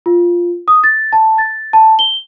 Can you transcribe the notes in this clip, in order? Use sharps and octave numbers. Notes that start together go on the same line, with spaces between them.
F4
D#6
A6
A5
A6
A5
G7